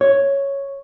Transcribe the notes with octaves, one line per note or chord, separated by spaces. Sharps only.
C#5